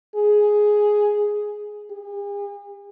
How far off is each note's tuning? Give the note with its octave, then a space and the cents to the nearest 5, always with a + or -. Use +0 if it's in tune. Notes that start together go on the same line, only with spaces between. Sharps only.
G#4 +5
G#4 -45